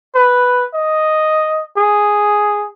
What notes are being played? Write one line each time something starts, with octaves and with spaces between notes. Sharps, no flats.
B4
D#5
G#4